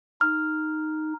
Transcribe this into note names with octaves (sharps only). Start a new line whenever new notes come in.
D#4 F6